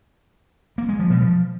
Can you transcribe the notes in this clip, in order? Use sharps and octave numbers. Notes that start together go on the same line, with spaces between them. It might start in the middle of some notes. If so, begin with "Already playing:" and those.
A#3
G#3
F3
B2
F3